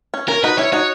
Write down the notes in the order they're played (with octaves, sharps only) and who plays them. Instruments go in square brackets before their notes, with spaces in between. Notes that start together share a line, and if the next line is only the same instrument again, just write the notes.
[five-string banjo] C#4
[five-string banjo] C#4 [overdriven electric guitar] A#4
[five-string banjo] D#4 F#4 [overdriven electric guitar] B4
[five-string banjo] C#4 E4 [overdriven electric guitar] C#5
[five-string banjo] D#4 F#4 [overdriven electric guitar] C#5